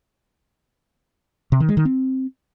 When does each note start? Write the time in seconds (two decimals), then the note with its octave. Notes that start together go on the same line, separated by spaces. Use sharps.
1.52 C3
1.60 D#3
1.69 G#3
1.77 D#3
1.85 C4